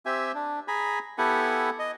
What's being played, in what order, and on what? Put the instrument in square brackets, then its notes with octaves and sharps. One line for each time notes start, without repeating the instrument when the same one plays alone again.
[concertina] C4 G4 E5 G#5
D4
G#4 G#5 A#5 B5
B3 E4 G4 A4 F#5 G#5
D#5